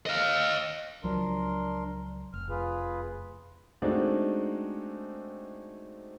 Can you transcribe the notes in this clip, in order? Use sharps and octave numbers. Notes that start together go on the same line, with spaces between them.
D#5 F5
C#2 F3 F#3 D4 A#4 C6
F1 F6
F4 G#4 B4
G#3 A3 C4 D4 D#4 F#4